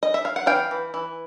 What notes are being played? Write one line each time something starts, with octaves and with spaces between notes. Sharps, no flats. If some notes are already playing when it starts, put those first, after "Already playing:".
D#5
E5
F5
F#5
E3 F5 G5
E3
E3